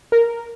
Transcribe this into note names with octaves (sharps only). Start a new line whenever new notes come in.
A#4